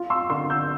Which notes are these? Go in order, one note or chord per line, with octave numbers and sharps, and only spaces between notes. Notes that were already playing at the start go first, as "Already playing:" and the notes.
Already playing: F4
C6 E6
D3 C6 E6
E6 G6